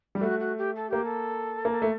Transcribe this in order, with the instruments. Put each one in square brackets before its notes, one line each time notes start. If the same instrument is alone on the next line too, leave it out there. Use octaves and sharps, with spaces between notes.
[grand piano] G3 [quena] G4
[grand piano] A3 [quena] F#4
[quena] F#4
G4
A4
[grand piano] A#3 [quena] G4
[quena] A4
[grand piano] A#3
A3